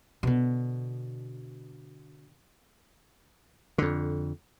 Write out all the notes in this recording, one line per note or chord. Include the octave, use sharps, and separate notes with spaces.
B2 D3
F2 D3